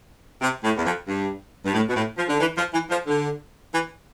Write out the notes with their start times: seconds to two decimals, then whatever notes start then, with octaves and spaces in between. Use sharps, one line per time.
0.41 C3
0.63 A2
0.76 E2
0.85 F2
1.07 G2
1.65 G2
1.74 A2
1.88 B2
1.95 A2
2.17 F3
2.28 D3
2.40 E3
2.56 F3
2.72 E3
2.90 F3
3.07 D3
3.73 E3